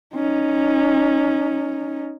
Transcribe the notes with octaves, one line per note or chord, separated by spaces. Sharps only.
C#4 D#4